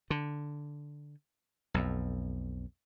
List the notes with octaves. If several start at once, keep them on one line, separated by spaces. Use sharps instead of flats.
D3
B1 F2